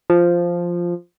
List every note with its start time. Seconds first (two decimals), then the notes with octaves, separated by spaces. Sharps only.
0.10 F3